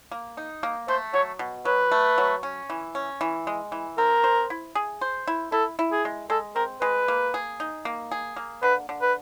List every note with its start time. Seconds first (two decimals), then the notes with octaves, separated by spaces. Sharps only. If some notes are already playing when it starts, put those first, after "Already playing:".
0.11 A#3
0.37 D#4
0.63 A#3
0.88 A3 C5
1.14 F#3 C#5
1.39 B2
1.65 F#3 B4
1.91 A3
2.18 F#3
2.43 C#4
2.70 E3
2.95 C#4
3.21 E3
3.47 G#3
3.72 E3
3.98 C4 A#4
4.24 C5
4.50 E4
4.75 G#4
5.01 C5
5.27 E4
5.52 E4 A4
5.79 E4
5.92 G#4
6.05 G#3
6.30 G#3 A4
6.56 C4 A#4
6.81 G#3 B4
7.08 A#3
7.34 G#4
7.60 D#4
7.85 A#3
8.11 G#4
8.36 A#3
8.63 D3 B4
8.89 D3
9.02 B4